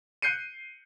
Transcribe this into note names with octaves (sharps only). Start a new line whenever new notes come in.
F#6 G6 C7 C#7 D#7